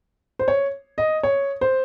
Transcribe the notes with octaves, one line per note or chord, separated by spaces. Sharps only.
C5
C#5
D#5
C#5
C5